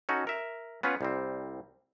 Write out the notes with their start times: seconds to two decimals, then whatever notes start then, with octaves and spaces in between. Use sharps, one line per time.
0.09 C#4 D#4 F#4 A4
0.27 A#4 E5
0.83 B3 C#4 F4 B4
1.01 C2 G3 C4